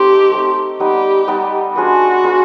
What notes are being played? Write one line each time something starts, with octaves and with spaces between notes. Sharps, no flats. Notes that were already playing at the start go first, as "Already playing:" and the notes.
Already playing: A3 C4 D#4 G4
A3 C4 D#4
G3 B3 D#4 G4
G3 B3 D#4
D4 F4 F#4 G#4 B4
D4 F4 G#4 B4